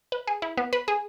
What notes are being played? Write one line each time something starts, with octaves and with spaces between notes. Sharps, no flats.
B4
G#4
E4
B3
B4
G#4